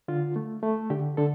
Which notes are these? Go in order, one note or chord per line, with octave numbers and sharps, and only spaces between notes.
D3 F4
A3
A3
D3 G4
D3 A4